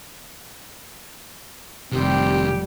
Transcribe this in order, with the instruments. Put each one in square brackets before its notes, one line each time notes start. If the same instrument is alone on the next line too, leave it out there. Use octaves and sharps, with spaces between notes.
[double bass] F1 G3 [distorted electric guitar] C3 D#3 [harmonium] C4 [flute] G4